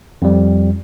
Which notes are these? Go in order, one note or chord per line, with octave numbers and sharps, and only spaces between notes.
F2 G3